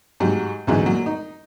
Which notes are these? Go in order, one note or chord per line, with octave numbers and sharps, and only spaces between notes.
G#2 F#3 G4
A1 D2 G#2 F#3 G#3
A#2 F#3
D#4